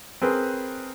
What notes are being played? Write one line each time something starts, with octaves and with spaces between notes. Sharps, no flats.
C4 G#4 A#4 B4